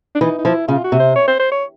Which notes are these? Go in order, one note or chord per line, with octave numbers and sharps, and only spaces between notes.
D4
E3 D#4
D#4
F3 E4
C#3 F4
F#4
C3
C5
C#5
C5
C5
C#5